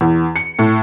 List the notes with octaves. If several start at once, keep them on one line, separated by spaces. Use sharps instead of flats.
E2
C#7
A2